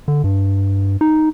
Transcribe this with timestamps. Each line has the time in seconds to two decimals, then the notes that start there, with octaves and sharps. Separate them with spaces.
0.08 D3
0.24 G2
1.01 D#4